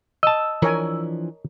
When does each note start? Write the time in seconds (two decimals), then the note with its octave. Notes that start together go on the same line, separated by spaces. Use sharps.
0.23 D#5 A5 E6
0.62 E3 F3 D4 A#4 C#5 G#5